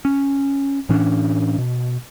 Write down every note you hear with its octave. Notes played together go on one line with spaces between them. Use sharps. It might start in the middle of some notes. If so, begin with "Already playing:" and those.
C#4
A2 E3 C#4 D4
B2